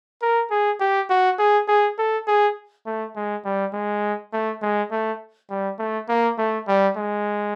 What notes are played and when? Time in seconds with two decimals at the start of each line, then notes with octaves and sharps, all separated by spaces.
0.22 A#4
0.51 G#4
0.80 G4
1.10 F#4
1.39 G#4
1.68 G#4
1.98 A4
2.27 G#4
2.86 A3
3.15 G#3
3.45 G3
3.73 G#3
4.33 A3
4.62 G#3
4.91 A3
5.50 G3
5.78 A3
6.08 A#3
6.38 A3
6.68 G3
6.97 G#3